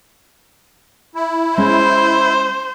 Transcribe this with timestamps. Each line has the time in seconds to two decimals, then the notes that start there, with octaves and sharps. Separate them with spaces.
1.15 E4
1.57 G#3 C#4 C5